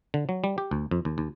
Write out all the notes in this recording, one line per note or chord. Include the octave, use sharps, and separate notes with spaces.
D3
F#3
G3
G4
D2
F2
D#2
D#2